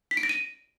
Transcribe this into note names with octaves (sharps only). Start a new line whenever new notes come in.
B6
D7
A#6
D#7